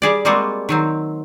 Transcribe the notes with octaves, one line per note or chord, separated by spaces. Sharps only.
G3 G#4 D5
G3 G#3 A#3 C4 F4 F#4
D#3 F#3 C4